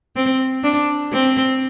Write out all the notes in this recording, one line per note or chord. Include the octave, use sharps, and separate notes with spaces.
C4
D4
C4